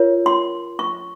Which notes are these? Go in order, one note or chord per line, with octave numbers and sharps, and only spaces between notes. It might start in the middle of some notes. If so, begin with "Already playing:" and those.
Already playing: F4 A#4 C#5
C6
C#6